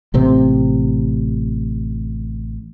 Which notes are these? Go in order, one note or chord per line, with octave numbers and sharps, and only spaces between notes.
A1 C3 C4